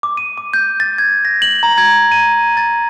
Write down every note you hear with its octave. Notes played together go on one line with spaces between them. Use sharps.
D6
D#7
D6
G6
A6
G#6
A#6
F#7
A#5
G#6
D#7
A6